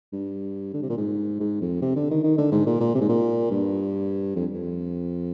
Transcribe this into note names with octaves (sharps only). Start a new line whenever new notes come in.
G2
D3
C3
A#2
G#2
G#2
F2
C3
D3
D#3
D#3
D3
G#2
A#2
A#2
C3
G#2
A#2
G2
F2
F2